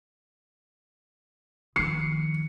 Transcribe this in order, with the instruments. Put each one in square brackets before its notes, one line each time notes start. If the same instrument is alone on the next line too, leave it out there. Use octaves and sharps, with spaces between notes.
[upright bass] D#3 F3 [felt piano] C7 C#7